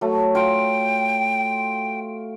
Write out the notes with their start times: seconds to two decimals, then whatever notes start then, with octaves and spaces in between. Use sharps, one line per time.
0.01 F#3 A3
0.35 F4 G5